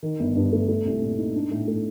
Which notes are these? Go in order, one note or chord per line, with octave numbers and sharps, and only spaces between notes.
D#3
G1
G2
A3
A3
C2
A#2
D#4
D4
A2
A3